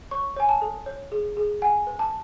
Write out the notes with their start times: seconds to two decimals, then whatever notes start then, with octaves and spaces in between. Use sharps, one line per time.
0.11 C#5 C#6
0.36 C#5 G#5
0.49 A5
0.62 A4
0.86 C#5
1.12 G#4
1.37 G#4
1.62 F#5 G#5
1.87 B4
1.99 A5